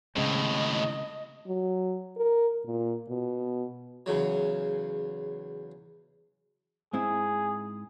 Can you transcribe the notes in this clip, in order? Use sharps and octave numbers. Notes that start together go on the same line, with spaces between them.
D#2 A2 C#3 G#3 C4 D#5
F#3
A#4
A#2
B2
E2 C#3 F#3
G#2 C4 E4 G#4